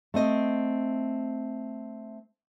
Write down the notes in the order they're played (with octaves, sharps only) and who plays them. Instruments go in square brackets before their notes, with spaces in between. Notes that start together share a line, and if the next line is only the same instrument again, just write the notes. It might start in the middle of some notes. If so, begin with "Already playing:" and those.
[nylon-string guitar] A3 C4 D#5